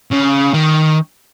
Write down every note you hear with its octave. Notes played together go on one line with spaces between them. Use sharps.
C#3
D#3